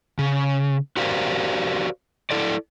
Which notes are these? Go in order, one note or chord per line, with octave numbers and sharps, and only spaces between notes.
C#3
F#4 G4 A#4 C5 D5 F5
E4 A4 D5